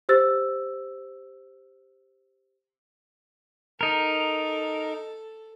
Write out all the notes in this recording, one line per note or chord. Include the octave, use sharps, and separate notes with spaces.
G4 C5 E6 A6
D#4 A4 A#4